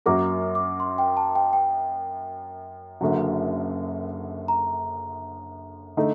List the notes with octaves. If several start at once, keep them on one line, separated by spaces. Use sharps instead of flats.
F#2 F#3 A#3 F#4 A#4 D6
D6
C6
G5
A5
G5
G5
F#1 F#2 D3 F#3
A#5
D3 A3 D#4